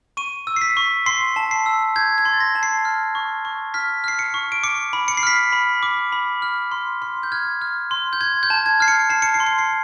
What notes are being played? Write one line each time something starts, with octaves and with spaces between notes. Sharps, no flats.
C#6 D#7
E6
C7
B6
C#6
C6 C7
A5
C7
E6
G6 G#6
G#6
C6
A6
A#6
A5
C7
F6
C#6
C#6
F6 B6
F6 C7
C#7
C#6
D7
D6 C#7
B5
C#7
C7
F6 B6
C7
B5
D6
B5
F6
C6
C6
G6
F6 G#6
F6
C6
G6
C6 G#6
G6
A5
G#6
F6 C7
C#7
A5 C7
C#7
C7
C6
C#7
C7